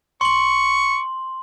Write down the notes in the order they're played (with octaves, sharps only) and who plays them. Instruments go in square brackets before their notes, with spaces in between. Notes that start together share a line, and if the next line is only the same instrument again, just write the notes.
[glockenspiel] C6 F#7 [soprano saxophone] C#6